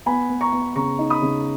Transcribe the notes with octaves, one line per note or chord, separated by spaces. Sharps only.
B3 G#5 B5
B3
A#5 C#6
B3
C#3 A#5 C#6
D#4
B5 D#6
C#3